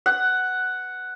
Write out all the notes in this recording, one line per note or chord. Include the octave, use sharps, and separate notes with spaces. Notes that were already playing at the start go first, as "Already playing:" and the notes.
F#5